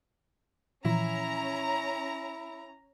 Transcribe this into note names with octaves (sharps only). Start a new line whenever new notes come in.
A#2 E3 F3 C#4 E4 A#5